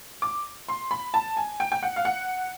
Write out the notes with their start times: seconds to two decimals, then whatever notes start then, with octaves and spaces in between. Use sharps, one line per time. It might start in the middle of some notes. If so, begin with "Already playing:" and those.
0.22 D6
0.69 C6
0.91 B5
1.14 A5
1.37 G#5
1.60 G5
1.72 G5
1.83 F#5
1.96 F5
2.05 F#5